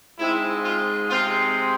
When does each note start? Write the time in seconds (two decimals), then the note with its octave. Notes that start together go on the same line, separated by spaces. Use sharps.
0.18 G#2 G#3 C4 E4
0.64 F4
1.10 C3 G#3 C4 F4